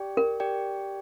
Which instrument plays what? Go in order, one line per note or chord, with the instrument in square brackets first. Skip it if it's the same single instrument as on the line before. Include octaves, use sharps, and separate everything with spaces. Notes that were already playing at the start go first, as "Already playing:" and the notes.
Already playing: [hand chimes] G4 D5 G5
[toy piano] A#4
[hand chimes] G4 D5 G5